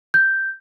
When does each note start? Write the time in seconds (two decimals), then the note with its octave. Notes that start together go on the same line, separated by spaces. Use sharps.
0.14 G6